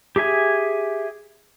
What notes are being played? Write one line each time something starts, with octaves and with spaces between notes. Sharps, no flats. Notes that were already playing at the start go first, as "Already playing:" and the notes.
G4 G#4 E5 G#5